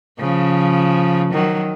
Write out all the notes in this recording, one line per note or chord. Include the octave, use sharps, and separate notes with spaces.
C#3 F3
D#3 F#3